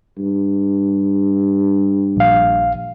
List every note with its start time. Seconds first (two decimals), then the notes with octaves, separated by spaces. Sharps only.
0.18 G2
2.16 A#1 F5